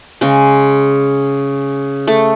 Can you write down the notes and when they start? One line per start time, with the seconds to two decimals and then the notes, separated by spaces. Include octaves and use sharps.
0.21 C#3 G#3
2.07 A3